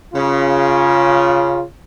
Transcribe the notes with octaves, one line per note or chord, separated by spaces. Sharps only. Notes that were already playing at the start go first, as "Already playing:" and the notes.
C#3 F4